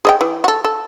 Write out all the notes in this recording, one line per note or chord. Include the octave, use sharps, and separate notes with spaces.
G#4 D#5 G5
E3
F#4 A4
A4